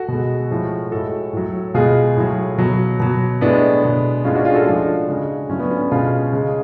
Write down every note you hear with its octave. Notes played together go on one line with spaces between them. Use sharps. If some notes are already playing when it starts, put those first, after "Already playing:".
Already playing: F#4 A4
B2 G#3
A2 F3 G#3
A2 G#3 F#4 A4
A2 F#3
B2 G#3 F4 G#4
A2 F#3
B2 F#3
B2 F#3
A2 G#3 B3 D4
B2 G#3
A2 G#3 C#4 F4
D4 F#4
F4 G#4
F#4 A4
A2 F3 G#3 D4 F#4
C#3 G#3
A2 F#3 C#4 F4
B3 D4
C#4
C#4
B2 G#3 C#4 F4
C#3 G#3